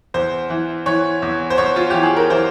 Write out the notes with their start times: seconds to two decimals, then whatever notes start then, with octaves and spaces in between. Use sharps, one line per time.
0.14 E2 C5
0.50 E3
0.86 E3 C#5
1.22 E2
1.50 C5
1.58 E2 C#5
1.76 F4
1.90 E3 G4
2.03 G#4
2.16 A#4
2.30 E3 C5